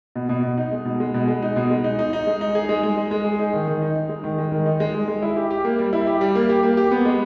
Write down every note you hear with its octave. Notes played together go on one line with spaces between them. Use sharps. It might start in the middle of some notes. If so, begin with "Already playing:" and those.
B2
B2
B2
D#4
G#3
B2
G#3
B2
G#3
D#4
B2
G#3
D#4
D#4
D#4
G#3
D#4
G#4
G#3
G#3
G#3
G#3
G#4
D#4
D#3
D#3
D#4
D#4
G#3
D#3
G#3
D#3
D#4
G#3
G#3
G#3
E4
G4
G4
A#3
G3
E4
G4
G3
A#3
G4
A#3
G4
B3
G#3